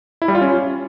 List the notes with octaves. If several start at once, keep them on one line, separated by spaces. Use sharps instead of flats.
E4
G3
F4
C#4